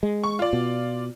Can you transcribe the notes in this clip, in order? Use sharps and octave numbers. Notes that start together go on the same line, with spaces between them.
G#3
C#6
F4 D5
B2